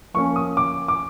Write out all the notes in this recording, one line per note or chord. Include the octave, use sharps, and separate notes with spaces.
F3 A#3 C#4 C#6
D#6
D6
D6